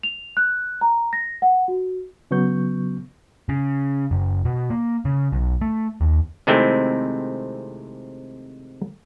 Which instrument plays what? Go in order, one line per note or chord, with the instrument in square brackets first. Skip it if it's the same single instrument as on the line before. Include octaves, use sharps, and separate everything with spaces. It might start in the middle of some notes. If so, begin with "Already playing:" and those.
[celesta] F7
F#6
A#5
A#6
F#5
F#4
[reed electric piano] C#3 F#3 B3 C#6 G6
[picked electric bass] C#3
F#1
B2
A#3
C#3
B1
A3
D#2
[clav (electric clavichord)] C3 D#3 G#3 A3 C4 E4